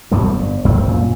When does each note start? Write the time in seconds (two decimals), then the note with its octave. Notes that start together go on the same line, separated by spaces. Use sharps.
0.11 F2 B2 G3 A3
0.25 G1
0.65 F#2 C4
0.86 F#2 A#2